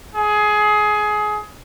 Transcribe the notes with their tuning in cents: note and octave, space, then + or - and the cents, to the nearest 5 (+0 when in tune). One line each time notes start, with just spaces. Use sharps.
G#4 +20